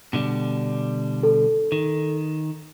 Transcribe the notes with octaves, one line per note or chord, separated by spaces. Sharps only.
B2 D3 G3
A4
D#3